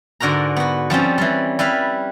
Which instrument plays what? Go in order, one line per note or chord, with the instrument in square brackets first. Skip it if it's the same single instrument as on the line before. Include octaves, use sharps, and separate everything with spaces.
[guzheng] G#2 D3 F#4 A#4 A#5
B3 F#4
F3 G3 C4 C#4
E3 G3
G3 E4 B4 F5